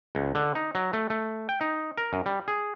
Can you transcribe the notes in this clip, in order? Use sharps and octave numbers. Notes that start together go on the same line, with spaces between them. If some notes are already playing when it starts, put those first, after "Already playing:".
C#2
D3
D#4
F#3
A3
A3
G5
D#4
A#4
F#2
G3
G#4